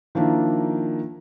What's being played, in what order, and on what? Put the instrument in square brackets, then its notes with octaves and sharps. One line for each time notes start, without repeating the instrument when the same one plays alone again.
[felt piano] D#3 F3 A#3 D4 E4